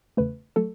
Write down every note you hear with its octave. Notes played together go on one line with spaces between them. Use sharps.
E2 C#3 A3 B4
F#3 A3 A4